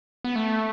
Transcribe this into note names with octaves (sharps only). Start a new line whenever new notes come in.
B3
A3